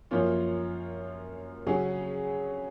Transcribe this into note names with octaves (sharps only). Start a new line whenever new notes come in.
F#2 F3 A#3 C#4 F4
C#3 F#3 C#4 G#4